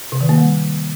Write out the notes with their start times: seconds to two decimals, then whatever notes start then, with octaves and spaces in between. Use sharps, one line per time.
0.12 C3
0.21 D#3
0.29 A#3
0.38 G3